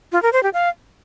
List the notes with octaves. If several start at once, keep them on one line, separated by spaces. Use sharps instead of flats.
F4
A#4
C5
G4
F5